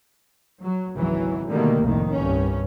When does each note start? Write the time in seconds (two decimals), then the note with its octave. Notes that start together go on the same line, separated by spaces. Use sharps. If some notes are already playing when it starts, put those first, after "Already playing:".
0.62 F#3
0.94 G#1 C#2 E3 F#3
1.48 B2 D3 D#3 G3 A3 A#3
1.81 C2 F2 A2 D#3
2.13 C2 G2 C#4